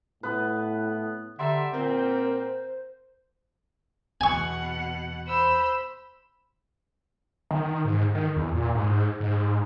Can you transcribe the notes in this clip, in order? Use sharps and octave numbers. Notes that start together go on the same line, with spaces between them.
A2 B3 B4
D3 G3 D5 E5 F#5 A#5 C6
A#2 C4 A#4 C5
E2 B2 F#5 G#5 C#6
C5 B5 E6
D#3
G#2
D#3
E2
A#2
G#2
G#2